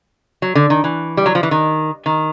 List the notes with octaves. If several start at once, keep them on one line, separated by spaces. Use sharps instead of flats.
F#3
D3
D#3
E3
G3
F#3
F3
E3
D#3
D#3